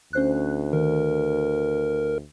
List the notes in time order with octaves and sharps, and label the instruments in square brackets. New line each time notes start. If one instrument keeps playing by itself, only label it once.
[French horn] D2 [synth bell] C#4 C5 F#6
[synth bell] D#3 [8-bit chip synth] A#4